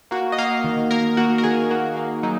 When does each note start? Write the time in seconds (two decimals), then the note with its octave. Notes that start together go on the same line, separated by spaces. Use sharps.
0.11 A#3 F#4
0.32 D#5
0.38 A#3 F5
0.64 D#3
0.91 A#3 A#4
1.17 A#3 F#4
1.38 A#4
1.44 D#3 G#4
1.70 A#3 F#4
1.97 A#3
2.23 F#3 D#4